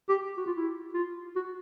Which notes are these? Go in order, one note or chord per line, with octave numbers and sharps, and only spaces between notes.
G4
F#4
F4
E4
F4
F#4